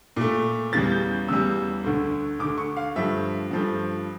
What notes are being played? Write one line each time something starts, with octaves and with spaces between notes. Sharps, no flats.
A#2 A3
E2 C#3 G3 A6
G6
E2 C#3 G3 E6
D2 D3 A3
D2 D3 A3 D6
C#6
F5
G2 F3 A3 E5
G2 F3 A3